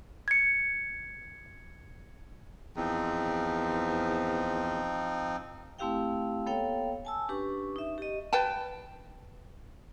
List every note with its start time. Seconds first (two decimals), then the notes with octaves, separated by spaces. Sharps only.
0.28 G#6 C#7
2.76 E2 F3 C4 D#4
5.79 A3 C4 E4 G4 F5 G5
6.46 A#3 B3 A4 C#5 F5 G5
7.05 G#5 A5 E6
7.28 C#4 D4 G4 B4 C#6
7.76 D#4 E5
7.98 G4 D#5
8.33 B4 G5 A5